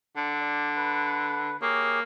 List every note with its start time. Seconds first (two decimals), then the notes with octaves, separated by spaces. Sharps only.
0.16 D3 D4
0.41 D5
0.77 B4
1.61 A#3 G4 G#4 C#5